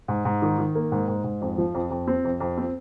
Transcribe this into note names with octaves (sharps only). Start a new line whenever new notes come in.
G#2
G#2
D#3
D#3
A#3
G#2
G#2
G#2
F2
F3
F2
F2
C4
F2
F2
C4